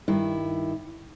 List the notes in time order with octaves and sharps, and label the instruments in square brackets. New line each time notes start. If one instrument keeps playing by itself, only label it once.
[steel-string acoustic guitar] G2 D#3 E4